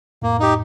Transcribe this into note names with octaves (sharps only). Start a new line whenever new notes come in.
F2 A2 A#3
D#4 G4